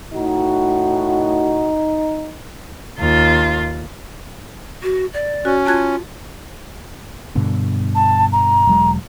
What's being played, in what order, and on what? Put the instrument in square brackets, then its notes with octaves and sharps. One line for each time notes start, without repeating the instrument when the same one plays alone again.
[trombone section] A2 F#4 [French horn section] D#4
[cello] D#2 F4
[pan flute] F#4
D5
[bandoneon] C#4 [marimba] F#4
[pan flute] F4 [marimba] A5 F#6 G#6
[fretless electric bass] G2 B2 D3
[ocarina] A5
A#5
[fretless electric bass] E1 F#3 G#3